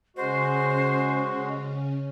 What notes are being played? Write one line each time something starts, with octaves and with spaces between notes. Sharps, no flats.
C#3 G#3 C#4 F#4 C5